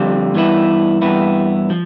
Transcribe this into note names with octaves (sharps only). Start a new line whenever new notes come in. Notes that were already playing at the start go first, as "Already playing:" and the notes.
Already playing: F2 D3 G3 C4 F4
G2 E3 B3 E4
G2 E3 B3 E4
F3